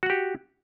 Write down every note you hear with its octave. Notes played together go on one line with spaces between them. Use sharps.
F#4 G4 F#5